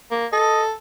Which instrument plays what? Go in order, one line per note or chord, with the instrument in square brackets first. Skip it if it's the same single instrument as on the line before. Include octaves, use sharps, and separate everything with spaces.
[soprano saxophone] A#3
[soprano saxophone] A4 [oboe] D#5